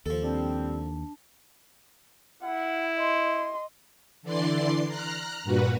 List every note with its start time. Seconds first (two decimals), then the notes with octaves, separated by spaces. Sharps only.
0.06 D#2 F3 A4
0.22 G3 C4 D4 A5
2.43 E4 F#5
2.97 D#5 C6
4.22 D3 E3 D5 C6 C7
4.88 A#5 F6 F#6
5.43 G2 A#2 F#4 B4